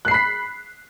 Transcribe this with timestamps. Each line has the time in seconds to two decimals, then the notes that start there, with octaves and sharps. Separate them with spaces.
0.05 F#6
0.08 C7
0.11 B5
0.14 B6